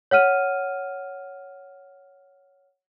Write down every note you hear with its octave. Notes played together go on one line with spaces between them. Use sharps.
C#5 F#5 F6 D#7